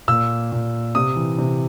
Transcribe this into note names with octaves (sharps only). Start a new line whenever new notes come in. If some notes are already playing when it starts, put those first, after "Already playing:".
A#2 E6
A#2
C3 D#6
E3
C3